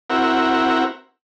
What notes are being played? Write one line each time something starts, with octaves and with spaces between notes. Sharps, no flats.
C4 E4 F#4 A#4